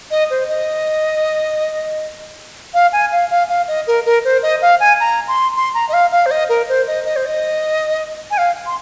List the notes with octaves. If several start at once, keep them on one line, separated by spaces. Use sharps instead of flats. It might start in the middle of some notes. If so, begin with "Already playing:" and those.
D#5
C5
D#5
F5
G#5
F5
F5
F5
D#5
A#4
A#4
C5
D#5
F5
G#5
A#5
C6
C6
A#5
D#5
F5
F5
C5
D#5
A#4
C5
D#5
D#5
C5
D#5
G#5
F5
C6